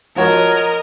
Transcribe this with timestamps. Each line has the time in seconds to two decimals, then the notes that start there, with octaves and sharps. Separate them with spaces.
0.16 F3 F#4 A#4 C#5 D#5